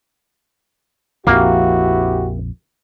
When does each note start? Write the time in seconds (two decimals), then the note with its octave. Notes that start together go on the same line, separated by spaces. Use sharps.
1.27 A#1 F2 F3 A#3 C4 E4 F#4 G4